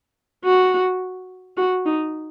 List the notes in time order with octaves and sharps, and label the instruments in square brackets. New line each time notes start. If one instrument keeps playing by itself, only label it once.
[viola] F#4
F#4
D#4